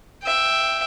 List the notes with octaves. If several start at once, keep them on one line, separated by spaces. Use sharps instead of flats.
E5 G5